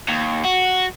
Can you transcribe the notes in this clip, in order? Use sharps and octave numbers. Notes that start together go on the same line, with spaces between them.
D#2
F#4